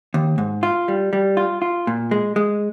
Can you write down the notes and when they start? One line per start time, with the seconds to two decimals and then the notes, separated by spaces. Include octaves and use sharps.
0.14 D#2
0.38 G#2
0.63 F4
0.88 G3
1.13 G3
1.37 F4
1.62 F4
1.87 A#2
2.11 G#3
2.36 G#3